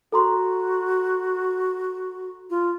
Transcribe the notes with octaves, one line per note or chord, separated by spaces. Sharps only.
F#4 A4 A#5 C6
F4